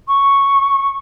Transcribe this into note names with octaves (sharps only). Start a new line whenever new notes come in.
C#6